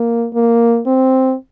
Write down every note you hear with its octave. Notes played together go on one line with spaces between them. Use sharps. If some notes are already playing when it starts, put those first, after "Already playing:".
Already playing: A#3
A#3
C4